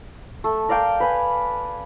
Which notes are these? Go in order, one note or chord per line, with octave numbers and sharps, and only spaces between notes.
A3
A#4 D5 F5 G5
B4 G#5